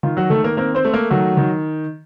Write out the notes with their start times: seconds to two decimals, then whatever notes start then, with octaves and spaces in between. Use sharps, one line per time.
0.03 D#3 F4
0.17 F#3 F#4
0.30 D#3 A3 A4
0.44 A#3 A#4
0.57 A#3 C4 A#4
0.75 C4 C5
0.85 A3
0.93 A#3 A#4
1.10 D#3 F#3 F#4
1.37 D#3